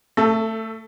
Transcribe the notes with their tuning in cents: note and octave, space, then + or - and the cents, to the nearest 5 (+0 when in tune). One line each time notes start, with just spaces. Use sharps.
A3 +20 A4 +0